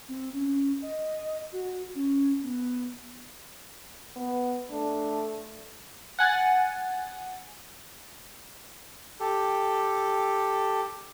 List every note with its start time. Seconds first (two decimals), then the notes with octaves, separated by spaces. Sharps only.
0.08 C4
0.32 C#4
0.82 D#5
1.52 F#4
1.95 C#4
2.43 B3
4.16 B3
4.71 A3 D4
6.19 F#5 G#5 F#6 A6
9.20 G4 A4